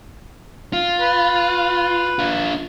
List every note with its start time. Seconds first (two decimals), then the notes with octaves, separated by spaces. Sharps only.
0.73 F4
1.01 B4
2.19 D4 F4